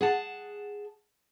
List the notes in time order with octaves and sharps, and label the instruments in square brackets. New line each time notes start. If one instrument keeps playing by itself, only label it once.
[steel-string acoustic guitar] G#4 F#5 A5